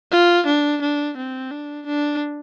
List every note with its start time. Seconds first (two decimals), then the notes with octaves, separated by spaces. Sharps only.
0.11 F4
0.47 D4
0.82 D4
1.17 C4
1.51 D4
1.86 D4